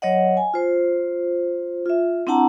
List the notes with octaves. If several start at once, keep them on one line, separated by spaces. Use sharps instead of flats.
F#3 C#5 D#5 F#5
G#5
F4 C5
F4 E5
C4 D4 E4 F#5 A5 A#5